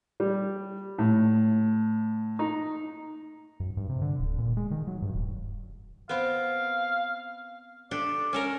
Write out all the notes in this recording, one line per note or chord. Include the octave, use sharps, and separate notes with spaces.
G3
A2
D#4
F#2
G2
C3
D3
D1
A#2
G#3
D#3
F#3
G2
D#1
B3 C4 F5
D4 G4 A4 D5
C#4 A4 A#4